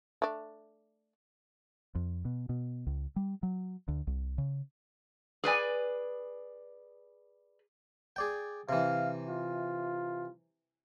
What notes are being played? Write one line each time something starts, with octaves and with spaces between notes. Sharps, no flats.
A3 D4
F2
B2
B2
C#2
G3
F#3
D2
C2
C#3
G#4 B4 D5 G#5
G#4 D5 G5
C3 E3 F5
F4